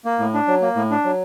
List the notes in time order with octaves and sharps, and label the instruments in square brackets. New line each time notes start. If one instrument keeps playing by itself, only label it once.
[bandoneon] A#3
A2
D4
F#3
A#3
A2
D4
F#3